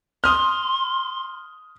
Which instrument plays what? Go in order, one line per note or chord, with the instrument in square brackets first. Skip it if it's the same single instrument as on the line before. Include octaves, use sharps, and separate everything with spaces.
[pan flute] C6 [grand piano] D#6 F6